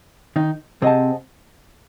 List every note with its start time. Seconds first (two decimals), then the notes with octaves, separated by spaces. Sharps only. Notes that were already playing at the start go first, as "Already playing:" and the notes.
0.36 D#3 D#4
0.82 C3 C4 G#4 D#5 F#5 A5